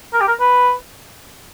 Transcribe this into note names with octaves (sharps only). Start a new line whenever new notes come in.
A#4
G4
A#4
B4